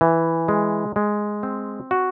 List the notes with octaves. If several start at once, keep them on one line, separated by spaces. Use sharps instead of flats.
E3
G#3
G#3
C4
F#4